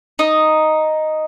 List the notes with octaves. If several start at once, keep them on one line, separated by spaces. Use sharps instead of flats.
D#4 D#5